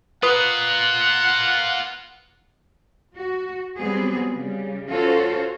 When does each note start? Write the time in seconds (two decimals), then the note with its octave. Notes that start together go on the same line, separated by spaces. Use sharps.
0.23 F4 A#4 B4 F#5 D#6
3.15 F#4
3.77 F#3 G3 B3 C4 G#4
4.33 C#3 G3
4.89 C#4 F4 F#4 A4 C5 C#5